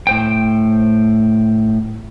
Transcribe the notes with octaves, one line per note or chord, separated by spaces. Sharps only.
A2 C5 G5